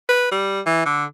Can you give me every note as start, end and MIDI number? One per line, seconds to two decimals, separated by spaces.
0.09 0.29 71
0.32 0.60 55
0.66 0.84 52
0.86 1.05 50